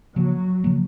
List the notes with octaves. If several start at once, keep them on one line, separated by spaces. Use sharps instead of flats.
C#3 F3 F#3 A#3
C#3 F3 A#3